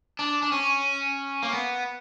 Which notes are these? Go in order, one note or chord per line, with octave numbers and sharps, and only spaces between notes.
D4
D4
C#4
A#3
B3